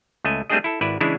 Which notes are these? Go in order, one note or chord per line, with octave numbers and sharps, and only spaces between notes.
C#2 A3 D#5 G#5
G3 A3 C4 D4 G#4 D#5
E4 A4
G#1 E4 B4 D5
C#3 E3 G#3 D4 E4